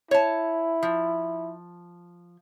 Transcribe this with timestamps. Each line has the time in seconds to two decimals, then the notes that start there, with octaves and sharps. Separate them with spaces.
0.11 E4 C#5 A5
0.83 F3